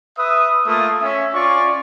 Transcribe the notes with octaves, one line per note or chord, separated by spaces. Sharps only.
B4 E5 D#6
A3 A#3 F4 D#6
C#4 E5
C#4 F4 D5 C#6